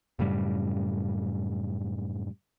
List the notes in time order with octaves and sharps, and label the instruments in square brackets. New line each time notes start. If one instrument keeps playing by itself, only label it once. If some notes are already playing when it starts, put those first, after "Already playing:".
[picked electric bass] F#2 A2 C#3 G3